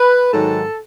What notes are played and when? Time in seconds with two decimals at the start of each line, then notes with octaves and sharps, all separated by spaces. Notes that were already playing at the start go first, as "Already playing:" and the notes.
Already playing: B4
0.32 G#2 D#3 F#3 A4